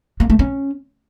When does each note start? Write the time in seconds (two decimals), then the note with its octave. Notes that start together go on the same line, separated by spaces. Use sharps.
0.20 A#3
0.30 A3
0.39 C#4